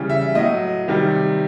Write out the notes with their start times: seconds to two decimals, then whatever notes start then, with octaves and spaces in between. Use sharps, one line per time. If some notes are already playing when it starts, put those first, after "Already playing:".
Already playing: C#3 E3 G3
0.10 E5
0.35 A2 F#3 D#5
0.88 C3 D#3 G3